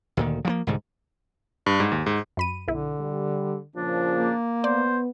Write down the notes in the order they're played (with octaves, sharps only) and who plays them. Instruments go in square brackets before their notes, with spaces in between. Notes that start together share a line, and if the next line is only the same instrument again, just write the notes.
[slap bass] D2 A#2 D#3
F3 F#3 A#3
C2 G#2 D3
[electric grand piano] G2
G#2
D#2
G#2
[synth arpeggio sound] F#2 B5 D#7
[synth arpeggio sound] B1 E4 [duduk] D3
[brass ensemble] G3
[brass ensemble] A#2 C#3 F3 [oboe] D4
[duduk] A#3
[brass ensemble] B3 [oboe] C5 [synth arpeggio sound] D5